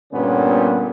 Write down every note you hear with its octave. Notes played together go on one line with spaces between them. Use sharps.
G2 A#2 D3 B3 C#4